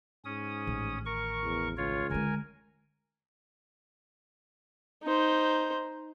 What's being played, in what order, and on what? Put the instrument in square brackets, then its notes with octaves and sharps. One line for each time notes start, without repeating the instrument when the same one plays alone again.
[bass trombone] G#2 [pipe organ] C#4 D#6
[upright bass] A1 D#3
[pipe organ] A#4 C#6
[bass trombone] E2
[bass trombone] C#2 [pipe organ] F4 C#5
[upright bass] D3 G#3 [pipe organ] A#4 G#5
[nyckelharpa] D#4 C5